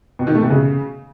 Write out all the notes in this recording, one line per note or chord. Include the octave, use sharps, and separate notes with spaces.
B2
D#3
A3
B2
C#3